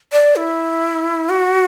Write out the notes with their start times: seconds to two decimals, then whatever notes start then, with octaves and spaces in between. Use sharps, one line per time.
0.12 D5
0.36 E4
1.29 F#4